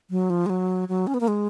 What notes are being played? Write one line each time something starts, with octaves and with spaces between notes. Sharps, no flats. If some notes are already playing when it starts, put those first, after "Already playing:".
F#3
F3
G#3
F#3
F#3
C#4
B3
A#3
G#3